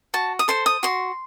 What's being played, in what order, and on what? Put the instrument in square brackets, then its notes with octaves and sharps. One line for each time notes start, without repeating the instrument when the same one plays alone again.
[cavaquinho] F#4 A5
D#6
A4 C5 C6
D#6
F#4 C6